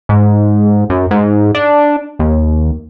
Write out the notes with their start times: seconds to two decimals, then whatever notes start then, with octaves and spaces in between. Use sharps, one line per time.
0.09 G#2
0.90 F#2
1.11 G#2
1.55 D4
2.19 D#2